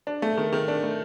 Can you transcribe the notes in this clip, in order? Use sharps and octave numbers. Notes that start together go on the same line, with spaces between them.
D4
A3
D#3
D#3
D4
A3